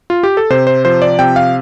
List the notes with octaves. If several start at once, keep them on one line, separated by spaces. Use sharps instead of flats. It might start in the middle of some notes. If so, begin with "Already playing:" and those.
F4
G4
A4
C3 C5
C5
F3 C5
D5
C3 G5
F5